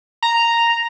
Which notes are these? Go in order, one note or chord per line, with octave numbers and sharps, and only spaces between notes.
A#5